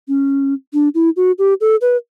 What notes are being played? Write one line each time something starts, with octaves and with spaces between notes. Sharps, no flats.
C#4
D4
E4
F#4
G4
A4
B4